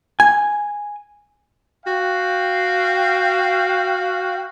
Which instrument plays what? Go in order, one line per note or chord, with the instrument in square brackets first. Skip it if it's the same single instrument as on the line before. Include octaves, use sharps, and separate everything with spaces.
[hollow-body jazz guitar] G#5
[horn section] F#4 F5 G5